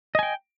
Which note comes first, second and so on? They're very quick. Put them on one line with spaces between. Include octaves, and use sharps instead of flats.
D#5 G#5 G5